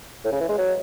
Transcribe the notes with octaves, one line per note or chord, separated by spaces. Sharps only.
A2
C#3
E3
G#3
F#3